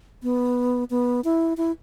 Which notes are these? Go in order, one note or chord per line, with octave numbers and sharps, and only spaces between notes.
B3
B3
E4
E4